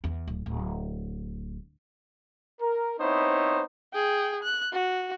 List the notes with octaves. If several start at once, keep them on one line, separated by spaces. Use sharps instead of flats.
E2
D1
D1
A#4
B3 C4 D#4 E4 C5 C#5
G#4 G5
F#6
F#4